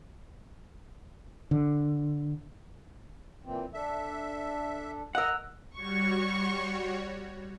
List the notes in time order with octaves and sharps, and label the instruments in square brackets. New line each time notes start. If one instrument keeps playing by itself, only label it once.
[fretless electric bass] D3
[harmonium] A#2 E3 C4
[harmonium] D4 A4 [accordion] E5
[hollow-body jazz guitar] A#4 F#5 [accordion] D#5 [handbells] E6 F#6
[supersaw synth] G3 F#4 C#5 [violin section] C#6